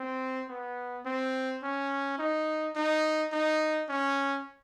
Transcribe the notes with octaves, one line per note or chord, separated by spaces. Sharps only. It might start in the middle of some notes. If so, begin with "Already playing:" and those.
Already playing: C4
B3
C4
C#4
D#4
D#4
D#4
C#4